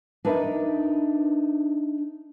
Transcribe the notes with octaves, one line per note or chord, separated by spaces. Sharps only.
D4 D#4 A#4 B4 D#5 E5